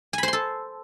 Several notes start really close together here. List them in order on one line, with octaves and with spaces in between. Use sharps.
G#5 B5 C5 C6 A4